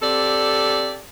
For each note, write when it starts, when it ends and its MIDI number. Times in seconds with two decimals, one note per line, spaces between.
0.02 1.01 60
0.02 1.01 67
0.02 1.01 69
0.02 1.01 74